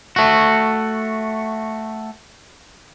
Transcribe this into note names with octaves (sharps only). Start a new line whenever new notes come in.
A3 F#4